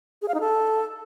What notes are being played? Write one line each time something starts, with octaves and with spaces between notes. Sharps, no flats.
G#4
F5
D#4
A4